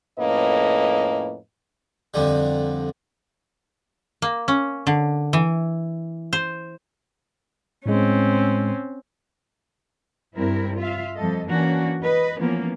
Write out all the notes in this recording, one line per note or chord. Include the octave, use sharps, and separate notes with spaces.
F2 A2 A#3 C#4 B4 D#5
F2 D3 G3
A#3
C#4
D3
E3
C5
A2 G#3 C4 C#4
G2 G3 C4 E4 A#4
F4 E5 F5
F2 G3 A4 D#5
E3 A#3 C#4 D4 F#4
B4 D#5
E3 F3 A#3 B3 C#4